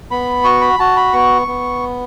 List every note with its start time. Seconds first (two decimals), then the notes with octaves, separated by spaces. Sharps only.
0.11 B3 B5
0.44 F#4 C#6
0.61 B5
0.79 F#4 A5
0.96 B5
1.13 B3 C#6
1.47 B3